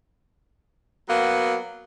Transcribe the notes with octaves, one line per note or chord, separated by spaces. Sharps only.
F#3 A#3 B3